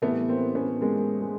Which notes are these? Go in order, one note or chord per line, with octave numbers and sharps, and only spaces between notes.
A2 E3 G3 A3 B3
A#3 C4
B3 C#4
G#3 A#3
G#3